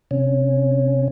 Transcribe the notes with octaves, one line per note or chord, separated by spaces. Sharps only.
C3 C#4